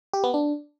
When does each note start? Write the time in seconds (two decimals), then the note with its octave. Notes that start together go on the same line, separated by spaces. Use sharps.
0.13 G4
0.24 B3
0.34 D4